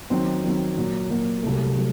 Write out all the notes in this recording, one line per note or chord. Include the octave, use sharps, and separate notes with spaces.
D#3 F#3 C4
D#3 F#3 C4
A#2 F#3 A#3
A#2 F#3 A#3
C2 C3 F#3 A3
F#3 A3